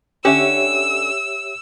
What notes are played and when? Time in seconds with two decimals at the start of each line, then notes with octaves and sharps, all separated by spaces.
0.25 D3 C#4 G4 C#5 E5 E6